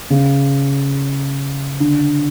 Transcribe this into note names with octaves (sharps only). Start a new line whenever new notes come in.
C#3
D3